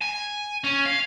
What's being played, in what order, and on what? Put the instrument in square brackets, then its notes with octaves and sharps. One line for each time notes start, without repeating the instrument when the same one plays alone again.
[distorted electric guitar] G#5
C#4
F5